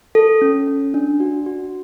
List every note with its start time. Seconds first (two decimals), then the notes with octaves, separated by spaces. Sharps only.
0.15 A4
0.42 C#4
0.68 C#4
0.94 D4
1.20 F#4
1.46 F#4